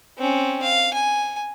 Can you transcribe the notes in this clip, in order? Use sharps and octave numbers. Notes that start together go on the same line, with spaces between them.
C4 C#4
F5
G#5